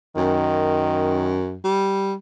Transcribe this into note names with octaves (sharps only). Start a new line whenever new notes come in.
F#2 D#3
G3